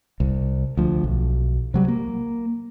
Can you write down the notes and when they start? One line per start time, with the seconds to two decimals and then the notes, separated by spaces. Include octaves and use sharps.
0.20 C2
0.77 D2 F3
1.04 B1
1.74 C3 F#3 G3
1.88 A#3